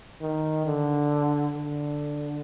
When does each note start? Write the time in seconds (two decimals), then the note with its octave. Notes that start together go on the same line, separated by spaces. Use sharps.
0.21 D#3
0.66 D3
1.57 D3